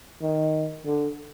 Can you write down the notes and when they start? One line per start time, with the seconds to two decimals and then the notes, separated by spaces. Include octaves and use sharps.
0.22 D#3
0.86 D3